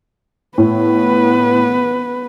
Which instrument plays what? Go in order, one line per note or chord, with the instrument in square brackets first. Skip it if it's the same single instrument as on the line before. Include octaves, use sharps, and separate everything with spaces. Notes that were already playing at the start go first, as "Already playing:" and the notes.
[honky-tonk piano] A2 [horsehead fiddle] B3 B4